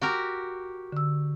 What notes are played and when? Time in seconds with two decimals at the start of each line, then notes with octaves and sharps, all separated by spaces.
0.01 F#4 G4 A#4
0.92 D3 E6